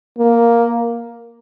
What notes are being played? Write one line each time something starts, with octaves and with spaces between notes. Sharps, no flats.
A#3